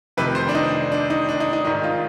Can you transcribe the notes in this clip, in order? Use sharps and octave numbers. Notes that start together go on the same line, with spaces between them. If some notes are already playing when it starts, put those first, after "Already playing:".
F1 F2 C3 D#3 B4
C5
D4
D#4
D4
D#4
D4
D#4
D#4
G#1 G#2 D#3 D#4
F4